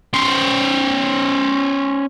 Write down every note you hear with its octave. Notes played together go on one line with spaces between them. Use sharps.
C#4 C5